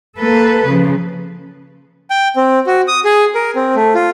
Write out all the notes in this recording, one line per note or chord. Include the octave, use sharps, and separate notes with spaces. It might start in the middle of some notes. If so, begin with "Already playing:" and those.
A#3 A4 B4
C#3 F3
G5
C4
F#4
D#6
G#4
A#4
C4
A3
F4